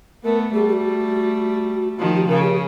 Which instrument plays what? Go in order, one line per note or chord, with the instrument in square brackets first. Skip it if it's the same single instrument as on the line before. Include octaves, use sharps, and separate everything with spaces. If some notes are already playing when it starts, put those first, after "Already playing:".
[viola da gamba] A3 B3 [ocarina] A#4
[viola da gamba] G3 A3 [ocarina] G#4
[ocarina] G4
F#4
[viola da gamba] D#3 F3 [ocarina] F#4
[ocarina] G4
[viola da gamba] C#3 [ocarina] A#4
[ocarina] G4